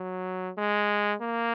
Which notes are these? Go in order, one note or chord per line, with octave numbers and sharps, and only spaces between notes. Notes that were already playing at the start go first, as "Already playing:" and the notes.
Already playing: F#3
G#3
A#3